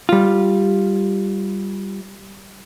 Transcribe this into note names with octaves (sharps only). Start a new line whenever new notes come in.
G3 F4